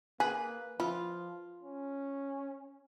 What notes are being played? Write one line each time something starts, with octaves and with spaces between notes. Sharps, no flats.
A#3 G#4 B4
F3 E4 F4
C#4